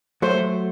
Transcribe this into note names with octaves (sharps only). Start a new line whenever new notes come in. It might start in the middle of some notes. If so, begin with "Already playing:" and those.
F#3 A3 C5